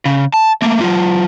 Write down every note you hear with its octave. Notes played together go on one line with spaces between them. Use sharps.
C#3
A5
A3 A#3
F#3 F4